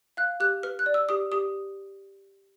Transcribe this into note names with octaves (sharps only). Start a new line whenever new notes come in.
F5 F#6
G4 F#6
B4 F6
F#6
D5
E6
G4 D#6
G4 D#6